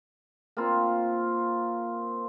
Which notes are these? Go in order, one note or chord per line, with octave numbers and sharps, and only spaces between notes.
A#3 C4 F4